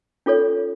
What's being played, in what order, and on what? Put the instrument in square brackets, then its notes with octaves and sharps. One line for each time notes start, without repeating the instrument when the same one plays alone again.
[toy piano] C#4 F4 A4 C#5